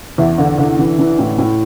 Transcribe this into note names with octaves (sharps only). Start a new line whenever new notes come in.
E2 E5
D3
D3
E3
E3
A2
A2